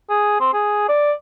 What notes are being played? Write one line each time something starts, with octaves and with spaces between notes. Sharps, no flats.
G#4
C4
G#4
D5